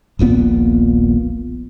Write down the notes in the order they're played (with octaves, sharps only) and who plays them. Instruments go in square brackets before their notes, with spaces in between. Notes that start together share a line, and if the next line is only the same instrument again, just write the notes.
[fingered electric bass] D#1 A#1 A#2 B3